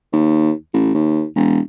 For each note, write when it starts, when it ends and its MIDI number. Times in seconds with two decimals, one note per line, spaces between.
0.13 0.52 39
0.73 0.92 33
0.95 1.25 39
1.36 1.60 28